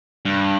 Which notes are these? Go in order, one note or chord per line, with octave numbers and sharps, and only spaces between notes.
G2